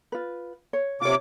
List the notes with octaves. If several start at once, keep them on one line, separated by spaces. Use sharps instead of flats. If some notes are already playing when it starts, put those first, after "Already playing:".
F4 B4
C#5
C3 F4 C#5 D6